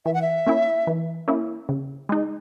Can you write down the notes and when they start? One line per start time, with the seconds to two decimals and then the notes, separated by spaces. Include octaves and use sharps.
0.06 E3 E5
0.14 F#5
0.22 E5
0.47 A#3 C#4 E4
0.87 E3
1.28 A#3 C#4 E4
1.69 C#3
2.09 G#3 D#4